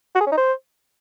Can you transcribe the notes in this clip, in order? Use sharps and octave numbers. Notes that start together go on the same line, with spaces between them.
F#4
G#4
C#4
D#4
C5